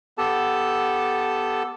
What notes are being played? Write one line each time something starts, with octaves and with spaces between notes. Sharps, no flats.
B3 G4 A4 A5